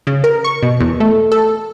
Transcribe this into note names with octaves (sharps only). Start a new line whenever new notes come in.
C#3
A#4
C#6
B2
E2
A3
A4